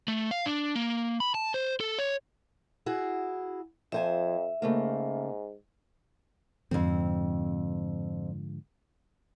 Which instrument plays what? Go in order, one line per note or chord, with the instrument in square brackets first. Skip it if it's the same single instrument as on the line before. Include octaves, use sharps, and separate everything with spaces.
[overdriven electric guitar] A3
F5
D4
A#3
B5
A5
C5
A4
C#5
[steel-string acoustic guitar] E4 F#4 G#4
[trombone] F2 [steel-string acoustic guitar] F3 C5 G#5 [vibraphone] E5
[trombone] G#2 [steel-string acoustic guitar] C#3 A3 A#3
[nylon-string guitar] F2 C4 [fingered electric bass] G#2 D3 F3